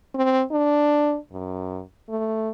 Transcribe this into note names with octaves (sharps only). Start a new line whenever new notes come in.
C4
D4
F#2
A3